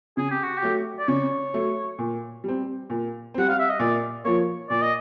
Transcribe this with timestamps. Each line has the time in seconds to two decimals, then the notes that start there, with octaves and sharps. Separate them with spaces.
0.17 C#3 G#4
0.31 G4
0.43 F#4
0.57 G4
0.62 F#3 A3
0.99 D5
1.08 C#3 C#5
1.54 F#3 A3
1.99 A#2
2.44 G3 C4
2.90 A#2
3.34 G3 C4 F#5
3.49 F5
3.59 E5
3.69 D#5
3.79 A#2 D5
4.25 F3 A#3 C#5
4.70 A#2 D5
4.82 D#5